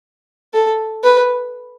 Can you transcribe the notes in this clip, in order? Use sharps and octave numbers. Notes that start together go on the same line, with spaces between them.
A4
B4